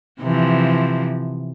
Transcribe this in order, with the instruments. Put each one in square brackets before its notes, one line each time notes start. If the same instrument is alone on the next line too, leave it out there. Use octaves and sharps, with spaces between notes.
[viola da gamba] C3 E3 F3